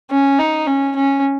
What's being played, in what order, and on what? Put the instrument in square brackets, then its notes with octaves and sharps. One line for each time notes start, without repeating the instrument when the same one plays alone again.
[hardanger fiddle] C#4
D#4
C#4
C#4